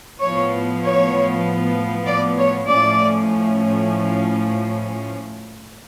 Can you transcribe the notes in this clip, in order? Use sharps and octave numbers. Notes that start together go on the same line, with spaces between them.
A2 F3 B3 C#5
C#5
D5
C#5
A2 F3 A3 C#4 D5